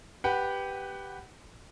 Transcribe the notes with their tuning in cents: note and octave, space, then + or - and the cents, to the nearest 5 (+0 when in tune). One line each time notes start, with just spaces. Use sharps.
G4 +0 B4 +0 F#5 +20